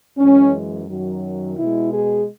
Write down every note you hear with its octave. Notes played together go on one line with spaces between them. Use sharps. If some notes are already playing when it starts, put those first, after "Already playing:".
F#2 E3 G#3 C#4
F#2 D#3 F#3
B2 G#3 E4
G#4